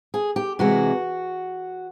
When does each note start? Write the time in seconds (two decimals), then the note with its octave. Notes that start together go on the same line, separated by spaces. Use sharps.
0.14 G#4
0.36 G4
0.59 C3 E3 G#3 F#4